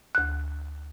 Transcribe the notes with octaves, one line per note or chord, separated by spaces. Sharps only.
D2 F#6